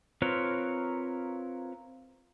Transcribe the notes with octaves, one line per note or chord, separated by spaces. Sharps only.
C4 F4 A#4 B4 C#5